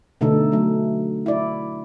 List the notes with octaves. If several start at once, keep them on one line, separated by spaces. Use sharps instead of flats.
B2 D3 A3 D#4 A4
F#3 A3
E4 D5